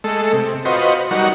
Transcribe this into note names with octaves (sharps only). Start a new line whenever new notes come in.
G#3 A3 A4
C3
F4 F#4 B4 C5 D#5
F#3 G3 D#4 F#4 A#4 F#5